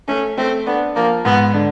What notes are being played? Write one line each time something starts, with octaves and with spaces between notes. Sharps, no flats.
A3 C#4
A3 C4
B3 D4
F3 A#3
G#2 B3
D3